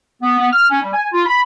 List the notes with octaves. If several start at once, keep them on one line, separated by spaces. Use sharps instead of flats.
B3
B3
F6
C#4
G3
G#5
F4
B5